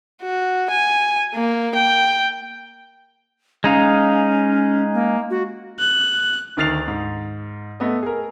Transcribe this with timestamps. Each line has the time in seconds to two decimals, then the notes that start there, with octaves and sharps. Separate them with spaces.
0.22 F#4
0.70 G#5
1.35 A#3
1.75 G5
3.64 G#3 C#4 D#4 F5
4.94 A#3
5.30 F#4
5.80 F#6
6.57 D2 D#3 F6 A6 C7 F7
6.88 G#2
7.80 A3 B3 D#5
8.03 G#4 A#4